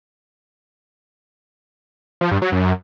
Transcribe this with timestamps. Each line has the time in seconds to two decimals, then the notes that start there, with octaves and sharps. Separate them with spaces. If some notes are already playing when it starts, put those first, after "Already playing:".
2.21 F3
2.31 G2
2.42 F#3
2.52 F#2